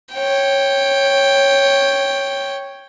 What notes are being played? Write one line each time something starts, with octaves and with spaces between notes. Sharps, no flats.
C#5 G5